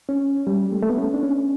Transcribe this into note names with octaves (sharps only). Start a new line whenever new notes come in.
C#4
G3
A3
A3
B3
C#4
D4
C#4